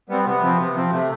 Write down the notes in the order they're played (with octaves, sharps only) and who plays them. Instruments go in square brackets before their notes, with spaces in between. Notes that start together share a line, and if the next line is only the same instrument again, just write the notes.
[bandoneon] G3 C4 [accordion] B3
[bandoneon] C3 [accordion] B3
[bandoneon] F3 C4
C3
F3 C4
[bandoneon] C3 [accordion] A3